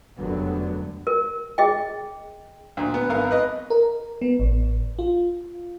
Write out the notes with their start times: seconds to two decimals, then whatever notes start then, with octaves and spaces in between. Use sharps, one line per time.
0.18 F1 F#2 D3 F#3 G3 B3
1.07 A#4
1.58 G#4 D#5 G5
2.77 D2 A#2
2.94 B3
3.09 G#1 B3 A#4 F5
3.31 B4 D#5
3.70 A#4
4.22 B3
4.39 A1
4.99 F4